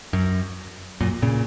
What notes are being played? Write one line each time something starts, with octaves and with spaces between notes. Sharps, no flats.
F#2
F#2 A#2
A#2 C#3